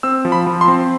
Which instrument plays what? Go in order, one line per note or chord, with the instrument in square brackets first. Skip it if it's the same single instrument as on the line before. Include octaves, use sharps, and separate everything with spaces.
[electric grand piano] C4 E6
F3
B5
F3
C6
C4